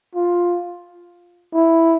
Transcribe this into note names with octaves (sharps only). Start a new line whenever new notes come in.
F4
E4